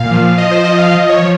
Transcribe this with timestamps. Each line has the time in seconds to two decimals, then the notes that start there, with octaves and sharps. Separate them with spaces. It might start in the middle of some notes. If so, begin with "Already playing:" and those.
Already playing: A#2 F5
0.11 F3
0.38 F3 D#5
0.51 C5
0.64 F3 D#5
0.78 F5
0.91 F3 D#5
1.09 C#5
1.19 F3